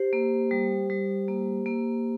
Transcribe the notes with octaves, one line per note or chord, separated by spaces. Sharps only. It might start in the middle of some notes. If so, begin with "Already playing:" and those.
Already playing: G4 C5
A#3
G3
G3
A#3
A#3